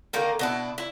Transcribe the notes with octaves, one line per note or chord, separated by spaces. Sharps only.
D3 D#3 A#3 A#4
B2 D4 E4
E4